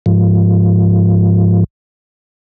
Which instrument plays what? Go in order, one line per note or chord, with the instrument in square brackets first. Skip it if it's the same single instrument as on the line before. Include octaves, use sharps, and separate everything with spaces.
[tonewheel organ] G#2 F3